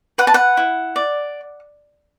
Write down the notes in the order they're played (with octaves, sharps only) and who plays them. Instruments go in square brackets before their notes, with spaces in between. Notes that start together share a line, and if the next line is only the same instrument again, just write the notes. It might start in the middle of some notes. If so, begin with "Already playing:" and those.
[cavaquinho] B4 F#5
A5
F#5
E4
D5